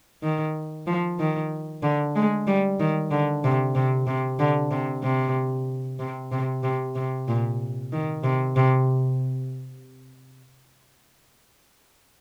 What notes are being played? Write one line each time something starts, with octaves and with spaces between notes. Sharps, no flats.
D#3
F3
D#3
D3
G#3
G3
D#3
D3
C3
C3
C3
D3
C3
C3
C3
C3
C3
C3
A#2
D#3
C3
C3